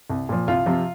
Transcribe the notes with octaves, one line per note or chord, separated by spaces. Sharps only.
C2
A#2 F3
C2 F4
C3 F3